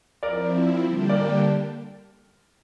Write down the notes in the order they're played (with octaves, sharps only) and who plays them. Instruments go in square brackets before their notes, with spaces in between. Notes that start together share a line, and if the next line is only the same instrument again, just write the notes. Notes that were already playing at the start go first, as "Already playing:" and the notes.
[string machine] F3 C4 E4 [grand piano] A#4 D5
[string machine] D3 G3 A#3 D4 G4
[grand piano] A#4 D5